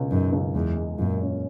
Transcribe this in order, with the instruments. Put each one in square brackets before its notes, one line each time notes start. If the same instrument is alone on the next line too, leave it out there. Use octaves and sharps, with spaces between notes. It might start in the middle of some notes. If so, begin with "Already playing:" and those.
Already playing: [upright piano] C#2 B2
[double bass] F#2 [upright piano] D#4
[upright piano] C#2
[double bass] E2 [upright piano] G#3
[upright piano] G#3
[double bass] F#2 [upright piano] A#2
[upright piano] C#4